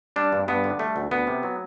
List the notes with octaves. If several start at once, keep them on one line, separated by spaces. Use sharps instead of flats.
G3 D4
G2
G2 B3
D3
G3 A3
D2
D2 B3
C3
F#3